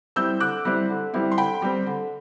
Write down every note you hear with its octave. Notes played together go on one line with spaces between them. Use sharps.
G3 C4 E4 E6 G6
D3 D6 F#6
G3 C4 E4
D3
G3 C4 E4
C6
D3 G5 B5
G3 C4
D3